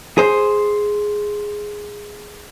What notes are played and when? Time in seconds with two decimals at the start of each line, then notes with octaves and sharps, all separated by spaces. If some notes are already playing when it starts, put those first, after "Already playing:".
0.18 G#4 C5